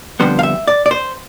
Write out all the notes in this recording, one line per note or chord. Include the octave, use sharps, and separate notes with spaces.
F2 D3 G3 B3 C5
F5
E5
D5
D5
C5